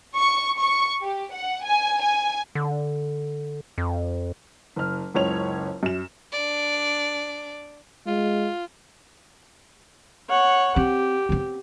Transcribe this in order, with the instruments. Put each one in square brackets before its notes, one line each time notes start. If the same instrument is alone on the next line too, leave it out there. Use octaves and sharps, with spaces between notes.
[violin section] C#6
C#6
G4
F#5
G#5
G#5
[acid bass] D3
F2
[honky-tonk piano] F#1 F6
F#1 C#2 C#5 F7
F#2 E7
[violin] D4 D5
[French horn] G#3 [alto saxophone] F4
[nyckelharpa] C#5 F#5
[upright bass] C4 [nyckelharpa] G4
[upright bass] B3 C4